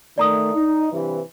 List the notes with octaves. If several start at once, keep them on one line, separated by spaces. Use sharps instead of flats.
D#3 A3 D5 A#5 D#6
D#4
G2 C3 E3